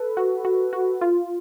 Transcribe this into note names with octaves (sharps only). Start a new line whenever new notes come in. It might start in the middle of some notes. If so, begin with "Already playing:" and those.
Already playing: A4 B4
F#4
F#4
F#4
F4